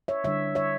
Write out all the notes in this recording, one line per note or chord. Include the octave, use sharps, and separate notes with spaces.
C#5 E5
D3 G3 D4 C#5 E5
C#5 E5